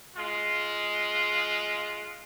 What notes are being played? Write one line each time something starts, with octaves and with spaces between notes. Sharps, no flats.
G#3 F4